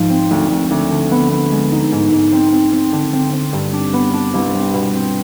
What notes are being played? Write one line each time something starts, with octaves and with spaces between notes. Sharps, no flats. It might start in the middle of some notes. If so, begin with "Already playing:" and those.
Already playing: G#2 F3
C4
D2
D2
D2
D3
B3
B3
G#3
D#4
G#2
G#2
C4
C4
C4
D3
C4
C4
G2
D4
B3
D4
C2
C4
B2
C4